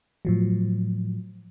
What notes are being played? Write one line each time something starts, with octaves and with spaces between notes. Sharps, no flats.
A2 F3 F#3